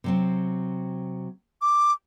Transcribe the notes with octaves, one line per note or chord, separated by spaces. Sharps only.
C3 F#3 C4
D6